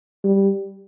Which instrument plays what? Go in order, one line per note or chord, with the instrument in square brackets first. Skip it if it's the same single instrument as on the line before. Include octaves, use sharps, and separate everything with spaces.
[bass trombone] G3